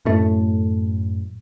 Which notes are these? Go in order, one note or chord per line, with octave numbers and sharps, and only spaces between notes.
F#2 A2 A3